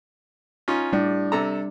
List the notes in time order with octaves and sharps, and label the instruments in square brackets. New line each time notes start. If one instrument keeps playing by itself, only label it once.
[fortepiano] C#4 D#4 F4
[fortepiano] A2 [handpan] G3 D4 D5
[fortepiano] C3 A4 A#5